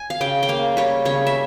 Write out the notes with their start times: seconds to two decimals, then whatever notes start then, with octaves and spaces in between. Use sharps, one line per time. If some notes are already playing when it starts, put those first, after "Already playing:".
Already playing: G#5
0.10 F5
0.21 C#3 G5
0.43 G5
0.49 A#3 F5
0.77 G3 C#5
1.05 C#3 C#5
1.27 E5